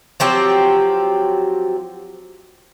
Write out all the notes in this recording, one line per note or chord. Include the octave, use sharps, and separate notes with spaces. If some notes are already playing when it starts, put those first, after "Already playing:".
F3 F#3 C4 G4